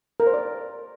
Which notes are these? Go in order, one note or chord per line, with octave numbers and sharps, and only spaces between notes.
A#4
C5
D5